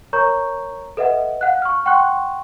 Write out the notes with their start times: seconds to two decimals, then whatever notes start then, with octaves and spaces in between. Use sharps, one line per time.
0.13 A#4 C#5 A#5 C#6 G6
0.97 A4 B4 D#5 E5 F#5
1.41 F5 F#5 F#6
1.62 C#6 F6
1.86 F#5 G5 C6 C#6 F#6